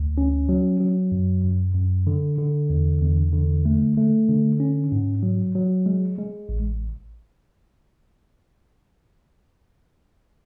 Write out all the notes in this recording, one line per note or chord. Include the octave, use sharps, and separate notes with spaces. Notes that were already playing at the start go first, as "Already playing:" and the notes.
Already playing: D2
C#4
F#3
F#3
F#2
F#2
F#2
D3
D3
E2
E2
D3
A3
A3
D3
C#4
G#2
F#3
F#3
G#3
G#3
A1